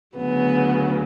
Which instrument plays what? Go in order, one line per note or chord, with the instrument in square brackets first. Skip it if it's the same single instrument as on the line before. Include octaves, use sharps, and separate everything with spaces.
[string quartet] D2 C#3 F#3 B3